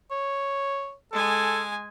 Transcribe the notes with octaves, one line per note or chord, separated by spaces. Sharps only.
C#5
G#3 A4 G#5